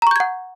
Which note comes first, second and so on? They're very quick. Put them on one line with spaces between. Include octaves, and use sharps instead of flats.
A#5 C#6 G6 G#6 F#5